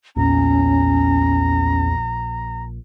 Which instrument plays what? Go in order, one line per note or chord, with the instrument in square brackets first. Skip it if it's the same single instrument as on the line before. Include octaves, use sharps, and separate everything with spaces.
[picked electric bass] A#1 A#2 [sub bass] E2 [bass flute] C#4 [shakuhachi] A#5